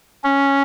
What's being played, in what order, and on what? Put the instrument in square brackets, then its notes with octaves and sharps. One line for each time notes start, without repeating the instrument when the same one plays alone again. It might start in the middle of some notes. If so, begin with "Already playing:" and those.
[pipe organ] C#4